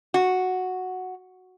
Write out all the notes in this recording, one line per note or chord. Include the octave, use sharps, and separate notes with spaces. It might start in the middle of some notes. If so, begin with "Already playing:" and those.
F#4